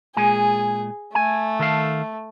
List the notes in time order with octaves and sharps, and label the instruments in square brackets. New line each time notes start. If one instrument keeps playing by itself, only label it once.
[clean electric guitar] A#2 G#3 G#5 [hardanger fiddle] G#4
[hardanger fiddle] A3 [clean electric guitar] G#5
[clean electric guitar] D#3 A4 F5